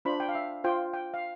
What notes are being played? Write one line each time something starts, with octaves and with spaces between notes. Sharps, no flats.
D4 F4 C5 B5
G5
F5
E5
F4 C5 G5
G5
F5